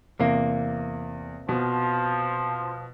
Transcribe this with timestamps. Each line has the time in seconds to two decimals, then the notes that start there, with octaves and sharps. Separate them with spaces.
0.19 E2 C3 A#3
1.49 B2 F3